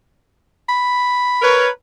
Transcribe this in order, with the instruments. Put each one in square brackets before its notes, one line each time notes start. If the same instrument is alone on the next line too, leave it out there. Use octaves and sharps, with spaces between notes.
[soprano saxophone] B5
[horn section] A#4 B4 C#5